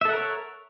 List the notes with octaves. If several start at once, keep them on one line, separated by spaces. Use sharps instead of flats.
A4 A#4 C#5 E5 F#5